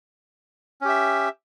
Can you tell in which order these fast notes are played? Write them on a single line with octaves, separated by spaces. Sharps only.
C#4 G4 E5